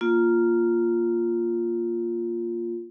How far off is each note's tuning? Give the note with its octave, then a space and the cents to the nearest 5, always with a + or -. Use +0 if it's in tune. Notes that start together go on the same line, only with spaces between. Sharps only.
A#3 +0 F4 +0